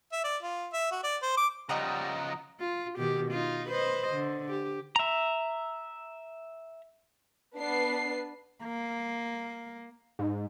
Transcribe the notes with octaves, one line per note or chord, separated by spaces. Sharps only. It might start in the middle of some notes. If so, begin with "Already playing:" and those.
E5
D5
F4
E5
F#4
D5
C5
D6
C#3 F3 G3 D#5 F#5 A#5
F4
B2 D#3 G4
D#4 F4
B4 C5 D#5
D3
G4
E5 A#5
B3 D4 B4 C7
A#3
G#2